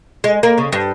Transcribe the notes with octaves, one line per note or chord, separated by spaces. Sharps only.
G#3
A#3
C#3
G2